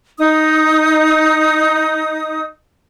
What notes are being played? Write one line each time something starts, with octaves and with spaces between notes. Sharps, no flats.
D#4 D#6